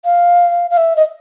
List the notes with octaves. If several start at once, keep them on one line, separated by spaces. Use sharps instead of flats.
F5
F5
E5
D#5